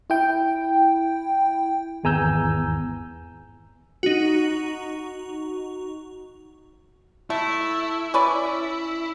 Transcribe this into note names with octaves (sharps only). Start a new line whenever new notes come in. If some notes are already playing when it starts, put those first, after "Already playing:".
E4 G5
G#1 E2 G#5 A#5 E6 G6
D#4 F#4
A3 E4
C#4 B4 D5